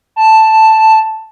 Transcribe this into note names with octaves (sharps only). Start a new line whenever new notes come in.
A5